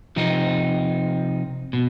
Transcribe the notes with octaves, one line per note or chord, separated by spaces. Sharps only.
C3 F3 C4 D#4
B2